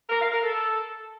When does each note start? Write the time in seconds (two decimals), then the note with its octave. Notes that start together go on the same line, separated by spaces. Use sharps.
0.10 A#4
0.21 F5
0.32 A#4
0.43 A4